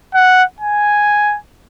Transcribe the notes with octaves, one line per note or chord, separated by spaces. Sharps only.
F#5
G#5